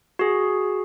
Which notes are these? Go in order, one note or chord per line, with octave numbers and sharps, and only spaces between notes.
F#4 G#4